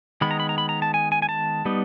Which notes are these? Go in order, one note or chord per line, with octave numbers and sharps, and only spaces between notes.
D#3 G#3 B3 B5
A#5
B5
A#5
B5
A#5
A5
G#5
G#5
G#5
A5
G3 B3 D#4